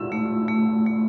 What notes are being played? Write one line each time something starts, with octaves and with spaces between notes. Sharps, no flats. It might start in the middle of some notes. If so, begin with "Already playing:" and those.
Already playing: E6
A3
A3
A3